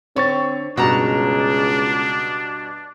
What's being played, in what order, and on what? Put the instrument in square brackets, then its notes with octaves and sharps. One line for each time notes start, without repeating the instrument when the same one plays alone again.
[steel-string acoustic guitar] D3 [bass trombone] C4 [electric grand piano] C#5 C#6 A6
[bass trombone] C#2 [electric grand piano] G2 B2 G4 [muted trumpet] D4 [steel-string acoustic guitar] F#4 A5 A#5